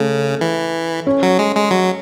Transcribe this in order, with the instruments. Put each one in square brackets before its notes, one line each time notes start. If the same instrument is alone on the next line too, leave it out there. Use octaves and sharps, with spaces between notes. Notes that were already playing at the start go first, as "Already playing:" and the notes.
Already playing: [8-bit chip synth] C#3 [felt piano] A3
[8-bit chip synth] E3
[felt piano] C#4
[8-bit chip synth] F#3
G#3
G#3
F#3